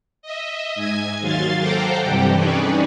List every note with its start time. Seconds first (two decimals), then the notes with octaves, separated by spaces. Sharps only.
0.22 D#5 E5
0.75 G#2 G#5 G#6
1.20 D#2 F#3 F5 C6 A6
1.60 A4 C5 F#5 G5 A#5 D6
2.03 G2 C3 E3 G3 G4 A4
2.35 C#4 D#4 G#4 B4 C#5 D5